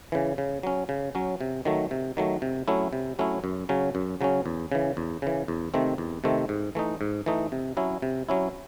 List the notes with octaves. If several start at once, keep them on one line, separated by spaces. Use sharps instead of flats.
C#3 E3
C#3
F#3 C#4
C#3
F#3 C#4
C3
D#3 F#3 A3
C3
D#3 F#3 A3
C3
F#3 A3 C#4 E4
C3
F#3 A3 C#4 E4
F#2
C#3 F#3 C#4
F#2
C#3 F#3 C#4
E2
C#3 E3
E2
C#3 E3
E2
C3 D#3 A3 C4
E2
C3 D#3 A3 C4
G#2
E3 A3 D#4
G#2
E3 A3 D#4
C3
F#3 C#4 E4
C3
F#3 C#4 E4